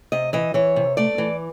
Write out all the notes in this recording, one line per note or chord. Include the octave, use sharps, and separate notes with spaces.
C3 D#5
E3 D#5
E3 C#5
C3
A3 D5
E3